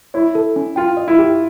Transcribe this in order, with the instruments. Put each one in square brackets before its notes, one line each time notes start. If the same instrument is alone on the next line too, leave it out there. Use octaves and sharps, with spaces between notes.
[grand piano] E4 [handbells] C#5
[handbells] A4
C#4
[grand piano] F4 [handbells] G5
[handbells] D#5
[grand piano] E4
[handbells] G4